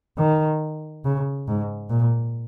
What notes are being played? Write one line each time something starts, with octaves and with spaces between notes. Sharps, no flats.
D#3
C#3
G#2
A#2